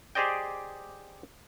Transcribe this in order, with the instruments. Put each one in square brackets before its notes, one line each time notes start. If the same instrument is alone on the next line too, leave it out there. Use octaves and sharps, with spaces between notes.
[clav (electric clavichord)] G4 G#4 C5 D5 D#5 G5